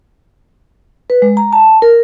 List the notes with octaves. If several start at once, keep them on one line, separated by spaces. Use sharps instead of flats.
B4
G#3
A#5
A5
A#4